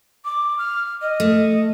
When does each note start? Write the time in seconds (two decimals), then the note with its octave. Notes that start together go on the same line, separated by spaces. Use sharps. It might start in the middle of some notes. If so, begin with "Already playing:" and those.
0.25 D6
0.59 F6
1.02 D#5
1.20 A3